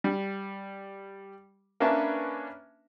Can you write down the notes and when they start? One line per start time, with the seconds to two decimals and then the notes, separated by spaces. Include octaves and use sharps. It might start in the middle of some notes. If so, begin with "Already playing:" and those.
0.04 G3
1.80 A#3 C#4 D4 B4 E5 A5